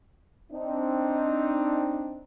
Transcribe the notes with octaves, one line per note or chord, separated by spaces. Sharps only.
C4 D4 D#4